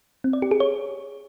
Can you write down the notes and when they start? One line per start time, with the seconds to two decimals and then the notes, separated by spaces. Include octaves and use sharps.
0.24 C4
0.33 D5
0.42 G4
0.51 G#4
0.60 C#5